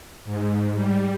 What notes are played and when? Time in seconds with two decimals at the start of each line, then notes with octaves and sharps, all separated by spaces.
0.25 G#2
0.74 G3